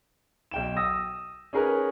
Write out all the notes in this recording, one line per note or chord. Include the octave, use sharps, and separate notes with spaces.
B1 G5 E7
D#6 E6 A#6
C#4 D#4 G#4 A#4 B4